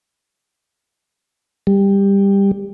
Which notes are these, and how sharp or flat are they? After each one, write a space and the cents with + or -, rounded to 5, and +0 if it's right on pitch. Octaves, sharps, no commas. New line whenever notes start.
G3 +15